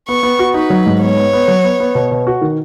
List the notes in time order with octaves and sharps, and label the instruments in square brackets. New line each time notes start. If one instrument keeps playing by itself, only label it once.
[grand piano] B3 [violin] C#6
[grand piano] B3
F#4
[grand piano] D#4 [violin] B4
[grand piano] F#3
G#2
[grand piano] B3 [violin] C#5
[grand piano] B3
B3
F#3
B3
B3
B2
B2
F#4
D#3